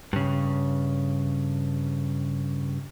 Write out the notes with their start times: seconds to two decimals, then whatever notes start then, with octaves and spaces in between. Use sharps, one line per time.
0.13 G2 C#3